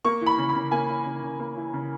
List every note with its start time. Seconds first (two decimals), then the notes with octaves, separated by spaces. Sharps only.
0.05 A#3 C#6
0.21 E3
0.26 B5
0.38 C#3
0.49 B5
0.55 C#3
0.71 A#3 G#5
0.89 E3
1.06 C#3
1.23 C#3
1.40 A#3
1.56 E3
1.73 C#3